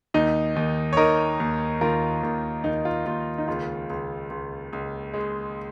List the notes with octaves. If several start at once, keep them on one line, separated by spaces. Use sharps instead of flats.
D#2 D#4
D#2
C#5
D#3 A#4 D#5
D#2
D#2 F4 A#4
D#2
D#2 D#4
F4
D#2 F4
D#4
C#2 F4
C#2
C#2
C#2
G#3